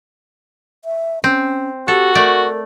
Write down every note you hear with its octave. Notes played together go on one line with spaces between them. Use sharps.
E5
C4 C#4
F#4 G4 A4
A3 A#4 D5